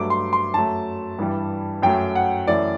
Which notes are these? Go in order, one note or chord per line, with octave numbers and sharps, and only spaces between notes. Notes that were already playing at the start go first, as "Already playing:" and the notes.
Already playing: G2 F#3 A3 D6
C6
C6
F#2 F#3 A3 A5
G2 E3 G3
F#2 F#3 A3 G5
F#5
F#2 E3 A3 D5